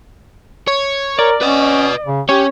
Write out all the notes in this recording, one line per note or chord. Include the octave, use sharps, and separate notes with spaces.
C#5
A#4 D5
C#4 B4 D#5
C#3
C#4 G4 C#5